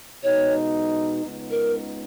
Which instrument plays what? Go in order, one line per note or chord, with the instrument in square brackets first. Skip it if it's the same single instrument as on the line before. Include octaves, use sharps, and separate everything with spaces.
[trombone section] B2 G#3 D#4 [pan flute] C#5
[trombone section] C#2 C#3 G#3 B3 D#4
[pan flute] A#4